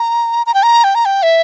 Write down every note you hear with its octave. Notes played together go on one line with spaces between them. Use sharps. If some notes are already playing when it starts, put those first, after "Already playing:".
Already playing: A#5
A#5
G5
A#5
G5
A#5
G5
E5